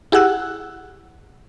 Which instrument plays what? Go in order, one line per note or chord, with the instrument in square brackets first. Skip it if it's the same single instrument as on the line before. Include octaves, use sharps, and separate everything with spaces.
[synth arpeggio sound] E4 G4 G#4 F#5 E6 F#6